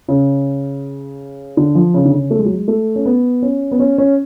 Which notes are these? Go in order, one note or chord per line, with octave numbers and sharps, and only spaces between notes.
C#3
D3
F3
C#3
D3
C#3
A3
G#3
F#3
G#3
A3
C#4
B3
C#4
B3
C#4
C#4